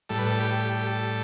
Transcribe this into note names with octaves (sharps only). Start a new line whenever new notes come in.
A2 G3 A4
B4
A4
G4
A4
G4
A4
G4
A4